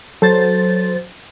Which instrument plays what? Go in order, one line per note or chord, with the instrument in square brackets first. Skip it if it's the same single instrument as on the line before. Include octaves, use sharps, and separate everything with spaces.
[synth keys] F#3 C5 A6 [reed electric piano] A4